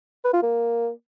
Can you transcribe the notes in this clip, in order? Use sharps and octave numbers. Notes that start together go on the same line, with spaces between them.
B4
F4
A#3